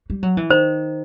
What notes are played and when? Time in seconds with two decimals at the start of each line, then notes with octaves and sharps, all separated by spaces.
0.10 G3
0.23 F#3
0.37 E3
0.50 D#3 C5